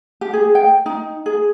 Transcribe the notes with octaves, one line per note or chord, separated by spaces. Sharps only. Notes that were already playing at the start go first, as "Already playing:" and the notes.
G4
G#4
G5
D#4
G#4